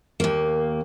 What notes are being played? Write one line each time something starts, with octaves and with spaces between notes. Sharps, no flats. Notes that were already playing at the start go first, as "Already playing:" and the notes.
D#2 A#3